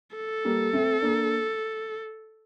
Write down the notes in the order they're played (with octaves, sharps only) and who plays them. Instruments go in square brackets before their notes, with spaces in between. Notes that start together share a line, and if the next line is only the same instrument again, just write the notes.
[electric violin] A4
[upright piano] G3 A#3
A3 C4
A#3 D4